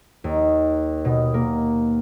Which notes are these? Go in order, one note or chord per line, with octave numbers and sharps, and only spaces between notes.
D#2
B2
A#3